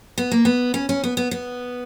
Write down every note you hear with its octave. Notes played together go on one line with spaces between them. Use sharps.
B3
A#3
B3
C#4
C#4
B3
B3
B3